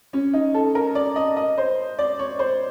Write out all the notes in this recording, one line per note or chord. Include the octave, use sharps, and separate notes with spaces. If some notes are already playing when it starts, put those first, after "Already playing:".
C#4
D#4
A4
A#4
D5
D#5
D#5
C5
D5
C#5
C5